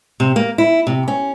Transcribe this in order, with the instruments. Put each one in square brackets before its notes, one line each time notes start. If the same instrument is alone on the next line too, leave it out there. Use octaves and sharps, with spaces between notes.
[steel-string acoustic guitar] C3
A#3
E4
C3
C#4